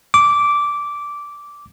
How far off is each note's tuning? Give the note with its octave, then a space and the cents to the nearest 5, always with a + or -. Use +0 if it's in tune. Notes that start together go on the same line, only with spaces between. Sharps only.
D6 -10